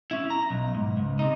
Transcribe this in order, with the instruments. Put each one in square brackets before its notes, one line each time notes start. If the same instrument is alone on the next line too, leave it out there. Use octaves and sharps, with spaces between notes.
[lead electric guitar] C#4 E4
A#5
B1
G#2
C#2
C3 D#4